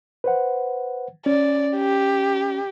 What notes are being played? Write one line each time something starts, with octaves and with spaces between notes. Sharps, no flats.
B4 C5 F#5
C#4 D5
G4